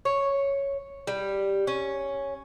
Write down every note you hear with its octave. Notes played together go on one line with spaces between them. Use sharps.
C#5
G3
C#4